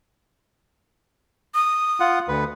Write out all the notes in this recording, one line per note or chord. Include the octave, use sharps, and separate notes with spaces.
D#6
F4 F#5
D2 B4